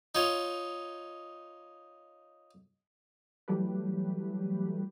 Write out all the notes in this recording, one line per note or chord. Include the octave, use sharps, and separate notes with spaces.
D#4 F4 C#5
E3 F#3 G3 A3 G4 B4